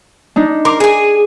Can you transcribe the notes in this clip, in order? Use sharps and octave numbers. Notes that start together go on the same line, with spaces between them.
D4 D#4
A#4 C6 D6
G#4 G#5